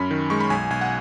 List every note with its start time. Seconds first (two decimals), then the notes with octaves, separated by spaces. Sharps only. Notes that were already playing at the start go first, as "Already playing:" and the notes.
Already playing: F#2 C#4 B5
0.11 D#3
0.30 G#3 C#6
0.40 B5
0.50 B1 G#5
0.70 B1 G#5
0.81 F#5